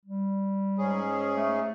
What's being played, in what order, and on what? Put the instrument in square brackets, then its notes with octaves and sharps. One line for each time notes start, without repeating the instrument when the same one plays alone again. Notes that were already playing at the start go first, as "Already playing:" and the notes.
[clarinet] G3
[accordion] G#2 C#4 G#4
[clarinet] A3